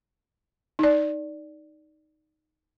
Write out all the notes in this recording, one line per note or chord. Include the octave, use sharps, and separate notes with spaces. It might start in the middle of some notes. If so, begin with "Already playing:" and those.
D#4 D5